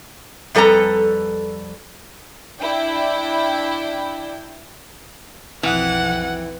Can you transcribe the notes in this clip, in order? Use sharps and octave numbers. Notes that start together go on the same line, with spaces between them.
F2 G3 A4 B4 A#5
D4 E4 G5
B1 F2 E3 F#5 G5